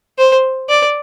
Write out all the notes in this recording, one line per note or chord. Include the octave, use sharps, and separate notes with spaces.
C5
D5